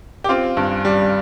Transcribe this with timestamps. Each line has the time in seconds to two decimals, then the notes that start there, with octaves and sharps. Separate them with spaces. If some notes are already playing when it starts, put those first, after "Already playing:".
0.24 G4
0.29 C4 F4
0.57 G2
0.85 G3